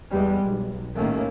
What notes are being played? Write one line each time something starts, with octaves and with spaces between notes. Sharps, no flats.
E2 G3 G#3
B1
D#2 A2 D#3 A3 A#3 C#4